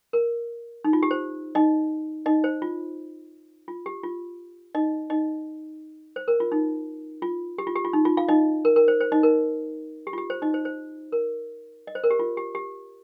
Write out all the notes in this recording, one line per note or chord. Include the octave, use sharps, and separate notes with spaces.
A#4
D#4
F4
G4
C5
D#4 D#5
D#4 D#5
C5
F4
F4
G4
F4
D#4 D#5
D#4 D#5
C5
A#4
F4
D#4
F4
G4
F4
G4
F4
D#4
F4
F4 F5
D#4 D#5
A#4
A#4
C5
C5
D#4 D#5
A#4
G4
F4
G4
C5
D#4 D#5
C5
C5
A#4
D#5
C5
A#4
G4
F4
G4
G4